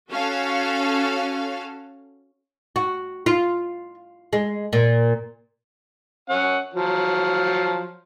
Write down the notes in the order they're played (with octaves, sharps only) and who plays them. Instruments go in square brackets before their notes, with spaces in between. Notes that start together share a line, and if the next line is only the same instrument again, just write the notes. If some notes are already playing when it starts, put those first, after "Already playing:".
[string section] C#4 F#4 A4 F5
[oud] F#4
F4
G#3
A#2
[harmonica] C#4 F#5
F3 F#3